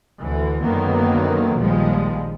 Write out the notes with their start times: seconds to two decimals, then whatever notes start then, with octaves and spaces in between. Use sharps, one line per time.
0.20 D2 D3 E3
0.63 F#2 D3 D#3 F#3 A#3 B3
1.58 A#1 D#2 F3 G3 G#3